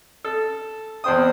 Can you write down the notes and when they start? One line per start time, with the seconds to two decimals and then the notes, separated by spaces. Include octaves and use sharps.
0.25 A4
1.04 E2 C4 C5 G5 D#6